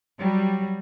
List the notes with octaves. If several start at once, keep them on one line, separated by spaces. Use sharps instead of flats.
F#3 G3